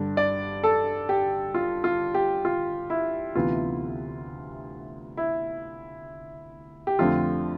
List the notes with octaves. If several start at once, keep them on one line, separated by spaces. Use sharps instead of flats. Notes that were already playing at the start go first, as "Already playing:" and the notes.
Already playing: G2 D3 G3 D4
D5
A4
G4
F4
F4
G4
F4
E4
D2 C3 E3 B3 F4
E4
G4
F2 D3 A3 C4 F4